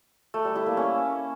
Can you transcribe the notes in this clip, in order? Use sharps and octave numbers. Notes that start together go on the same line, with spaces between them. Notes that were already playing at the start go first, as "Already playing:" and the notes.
A3
G3
E4
A#3
C#4